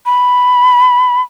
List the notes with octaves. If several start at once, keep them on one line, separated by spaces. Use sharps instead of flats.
B5